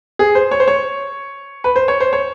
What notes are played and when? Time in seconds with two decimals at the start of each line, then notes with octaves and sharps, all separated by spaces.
0.19 G#4
0.35 C5
0.51 C#5
0.60 C5
0.68 C#5
1.64 B4
1.76 C5
1.88 C#5
2.00 C5
2.13 C#5